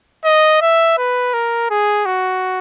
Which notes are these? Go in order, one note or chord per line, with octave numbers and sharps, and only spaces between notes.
D#5
E5
B4
A#4
G#4
F#4